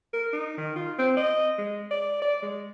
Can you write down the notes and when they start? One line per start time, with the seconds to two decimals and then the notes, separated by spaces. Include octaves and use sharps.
0.13 A#4
0.33 D#4
0.58 D#3
0.76 F4
0.99 C4
1.17 D#5
1.58 G#3
1.91 D5
2.22 D5
2.42 G#3